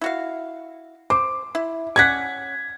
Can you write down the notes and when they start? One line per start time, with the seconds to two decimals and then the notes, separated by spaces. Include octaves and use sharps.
0.01 E4 F#4 F5
1.10 C5 D6
1.55 E4
1.96 C#4 D5 F#5 G#6 B6